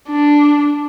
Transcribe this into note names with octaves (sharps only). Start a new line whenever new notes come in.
D4